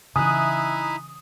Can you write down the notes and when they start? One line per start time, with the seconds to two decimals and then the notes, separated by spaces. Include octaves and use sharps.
0.16 C#3 E3 D#4 E4 E5 G#5 D#6 F#6